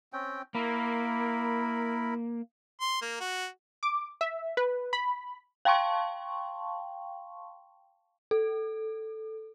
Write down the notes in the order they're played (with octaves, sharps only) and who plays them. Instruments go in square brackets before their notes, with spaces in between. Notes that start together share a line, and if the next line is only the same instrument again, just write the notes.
[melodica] C4 C#4 G5
[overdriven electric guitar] A#3 [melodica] E4 A#4 B5
[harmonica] C6
A#3
F#4
[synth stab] D6
E5
B4
B5
[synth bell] F5 G5 A5 C6 C#6
A4